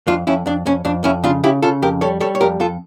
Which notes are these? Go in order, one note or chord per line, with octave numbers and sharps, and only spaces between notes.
F2 D4 F4
F2 C#4 E4
F2 D4
F2 C#4
F2 D4
F2 C#4 E4
C#3 D4 F4
C#3 E4 G4
C#3 F4 A4
F2 G4 A#4
G3 A4 C#5
G3 A4 C#5
C#5
F2 G4 A#4
F2 F4 A4